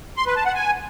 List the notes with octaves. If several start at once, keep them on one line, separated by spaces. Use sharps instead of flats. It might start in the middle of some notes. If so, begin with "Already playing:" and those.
C6
B4
A5
F#5
G#5